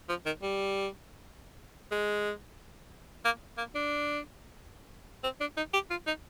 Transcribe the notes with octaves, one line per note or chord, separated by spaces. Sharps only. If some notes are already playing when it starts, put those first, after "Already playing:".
F3
D#3
G3
G#3
A#3
A#3
D4
C4
D4
D#4
G4
F4
D#4